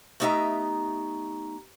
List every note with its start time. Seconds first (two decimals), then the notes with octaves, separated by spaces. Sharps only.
0.20 A3 B3 D#4 G4 E5 A#5